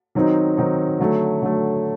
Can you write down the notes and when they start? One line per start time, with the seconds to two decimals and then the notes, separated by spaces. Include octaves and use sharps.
0.15 D#3 F#3 C4 D#4
0.57 D#3 F#3 C4 D#4
0.99 D3 F#3 A3
1.42 D3 F#3 A3